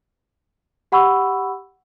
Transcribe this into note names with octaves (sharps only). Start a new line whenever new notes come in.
G4 F#5 B5 C#6 E6